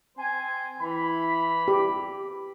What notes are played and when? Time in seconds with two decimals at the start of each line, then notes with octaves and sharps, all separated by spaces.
0.18 C4 C5 G#5
0.81 E3 B5
1.68 G4